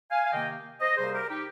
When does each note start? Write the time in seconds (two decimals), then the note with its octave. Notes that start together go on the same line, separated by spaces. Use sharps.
0.11 F5 G#5
0.24 F5
0.32 C3 D#3 A#3 D#5 G5
0.81 C5 D#5
0.97 C3 G3 A#3 G#4 C5
1.13 G4 A#4
1.29 D#4 G4